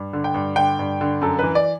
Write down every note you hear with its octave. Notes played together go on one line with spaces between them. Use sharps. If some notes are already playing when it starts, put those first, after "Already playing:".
Already playing: G2
D3
G5
G2
D3 G5
G2
D3
F#2 A4
E3 B4
D5